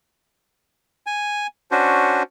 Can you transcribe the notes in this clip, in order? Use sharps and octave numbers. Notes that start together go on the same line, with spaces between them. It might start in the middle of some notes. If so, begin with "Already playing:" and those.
G#5
C#4 D4 F#4 C5